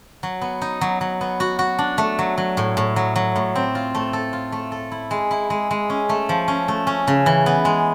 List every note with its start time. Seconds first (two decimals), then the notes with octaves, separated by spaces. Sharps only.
0.23 F#3
0.41 B3
0.62 D#4
0.81 F#3
1.01 F#3
1.21 B3
1.40 F#4
1.59 F#4
1.79 D4
1.98 A3
2.19 F#3
2.38 F#3
2.57 A2
2.77 A2
2.96 F#3
3.16 F#3
3.36 A2
3.55 C4
3.75 F4
3.95 A3
4.13 A4
4.33 F4
4.52 A3
4.72 A4
4.91 E4
5.11 G#3
5.31 E4
5.50 G#3
5.71 G#3
5.90 C#4
6.09 A3
6.29 F3
6.48 C#4
6.68 A3
6.87 C#4
7.07 C#3
7.26 E3
7.46 B3
7.65 G#3